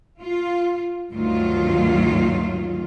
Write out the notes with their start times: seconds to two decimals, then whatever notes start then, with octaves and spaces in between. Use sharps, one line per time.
0.22 F4
1.11 D2 G2 D#3 F#3 A3 F4